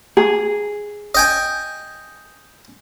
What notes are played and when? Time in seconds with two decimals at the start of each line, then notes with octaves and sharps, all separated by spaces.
0.17 G#4
1.15 D#5 G5 G#5